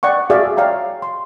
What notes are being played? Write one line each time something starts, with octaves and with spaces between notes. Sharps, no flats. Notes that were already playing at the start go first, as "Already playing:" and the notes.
D5 F#5 G5 C#6
F#4 G#4 A4 D5 E5 F5
C#5 D5 F5 G5 A#5
C6